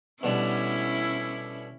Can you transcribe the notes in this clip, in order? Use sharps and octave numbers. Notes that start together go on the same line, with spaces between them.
B2 D3 G3 C#4 E4